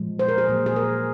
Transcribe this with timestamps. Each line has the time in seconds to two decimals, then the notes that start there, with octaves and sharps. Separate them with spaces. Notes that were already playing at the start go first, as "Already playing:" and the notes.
Already playing: A#2 F3 G#3
0.19 C5
0.29 A#4
0.38 G#4
0.49 A#2 F#3 A#3
0.66 G#4
0.76 A#4